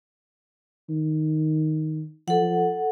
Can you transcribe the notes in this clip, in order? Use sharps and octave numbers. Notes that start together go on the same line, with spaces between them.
D#3
F3 A4 F#5